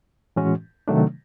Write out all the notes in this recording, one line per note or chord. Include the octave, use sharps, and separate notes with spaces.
A2 E3 G#3 C#4 F#4
C3 D#3 F#3 A3 D4